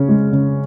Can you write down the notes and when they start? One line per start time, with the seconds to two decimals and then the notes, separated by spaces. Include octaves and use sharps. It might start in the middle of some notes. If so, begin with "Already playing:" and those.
Already playing: C#3 C#4
0.09 G#3
0.32 C#3